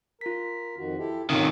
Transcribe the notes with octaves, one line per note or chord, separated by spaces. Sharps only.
F4 A#4 B6
F2 D#3 F#4
E4 G4 A4
C3 D#3 F#3 C#4 F4